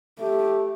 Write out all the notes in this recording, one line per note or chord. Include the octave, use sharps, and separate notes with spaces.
A3 G4